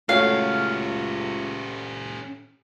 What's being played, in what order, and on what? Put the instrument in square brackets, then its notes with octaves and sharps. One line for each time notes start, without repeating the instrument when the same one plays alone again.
[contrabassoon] C#2 [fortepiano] A3 F#4 C#5 [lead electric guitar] C#4 G4 [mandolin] F5